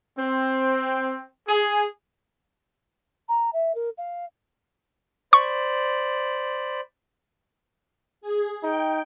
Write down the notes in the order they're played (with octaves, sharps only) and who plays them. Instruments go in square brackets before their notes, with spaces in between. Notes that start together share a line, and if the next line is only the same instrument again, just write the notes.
[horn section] C4
G#4
[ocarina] A#5
E5
A#4
F5
[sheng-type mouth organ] C5 D5 B5 [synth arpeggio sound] C#6
[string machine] G#4
[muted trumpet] D#4 [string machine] G5